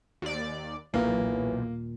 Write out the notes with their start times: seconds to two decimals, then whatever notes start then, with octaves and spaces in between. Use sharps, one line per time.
0.22 D#2 D5
0.94 D#1 B1 A#2 E3 A#3